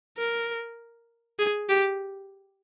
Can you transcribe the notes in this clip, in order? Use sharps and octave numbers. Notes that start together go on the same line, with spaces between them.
A#4
G#4
G4